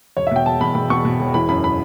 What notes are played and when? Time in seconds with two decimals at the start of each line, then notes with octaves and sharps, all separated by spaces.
0.17 E1 C#5
0.27 E5
0.31 B2 G5
0.46 E1 A5
0.61 E2 B5
0.75 B2 B5
0.90 E2 C#6
1.05 B2
1.19 E1
1.34 E3 B5
1.49 F#2 B5
1.64 B5